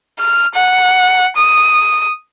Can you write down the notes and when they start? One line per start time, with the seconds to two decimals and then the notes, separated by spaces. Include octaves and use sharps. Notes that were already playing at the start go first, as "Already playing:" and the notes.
0.19 F6
0.55 F#5
1.37 D#6